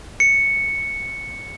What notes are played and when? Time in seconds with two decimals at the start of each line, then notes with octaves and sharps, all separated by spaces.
0.20 C#7